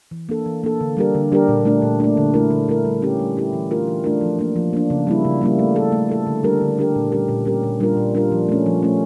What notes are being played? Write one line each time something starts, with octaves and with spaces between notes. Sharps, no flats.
E3
A#3 D4 A4
E3
A#3 D4 A4
D3
G3 D4 G4 A#4
D3
G3 D4 G4 A#4
A#2
A3 D4
A#2
A3 D4
D3
A3 E4 A#4
D3
A3 E4 A#4
G3
C#4 E4 G4
G3
C#4 E4 G4
E3
A3 D4 F4 A#4
E3
A3 D4 F4 A#4
F3
A#3 D4
F3
A#3 D4
C#3
G3 A#3 E4
C#3
G3 A#3 E4
A3
E4 A4
A3
E4 A4
D3
G3 D4 G4 A#4
D3
G3 D4 G4 A#4
A#2
G3 C#4 G4 A#4
A#2
G3 C#4 G4 A#4
A#2
G3 D4 F4 A#4
A#2
G3 D4 F4 A#4
F3
A3 C#4
F3
A3 C#4